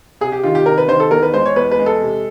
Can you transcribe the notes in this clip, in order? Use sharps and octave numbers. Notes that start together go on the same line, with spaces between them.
C3 G#4
G4
D#3 F4
G4
C3 A#4
B4
D#3 C5
A4
E2 A#4
B4
G#3 C5
C#5
E2 B4
B4
G#3
A4
C3